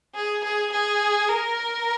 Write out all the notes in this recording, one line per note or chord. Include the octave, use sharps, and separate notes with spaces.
G#4
G#4
G#4
A#4